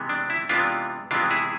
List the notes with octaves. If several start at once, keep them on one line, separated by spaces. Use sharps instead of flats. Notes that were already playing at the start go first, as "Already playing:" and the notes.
Already playing: C3 E3 G#3 B3
D4
E4
C3 E3 G#3 B3 D4 F4
C3 E3 G#3 B3 D4 F4
E4 G#4